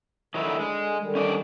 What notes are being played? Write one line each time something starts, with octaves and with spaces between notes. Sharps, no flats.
D3 D#3 F#3 E4
G#3
D3 D#3 G3
C#4 D#4 D5